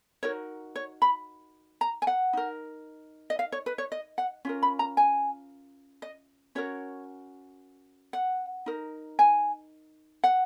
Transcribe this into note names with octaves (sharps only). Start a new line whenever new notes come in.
D#4 F#4 A#4 C#5
C#5
B5
A#5
G#5
F#5
D#4 A#4
D#5
F5
C#5
B4
C#5
D#5
F#5
C#4 F4 A#4
B5
A#5
G#5
D#5
C#4 F#4 A#4 C#5
F#5
D#4 A#4
G#5
F#5